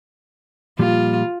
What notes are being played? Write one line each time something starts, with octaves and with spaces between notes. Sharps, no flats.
A#2 F3 G3 F4